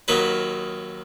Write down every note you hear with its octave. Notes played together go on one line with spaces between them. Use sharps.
D#2 D#3 F#3 B4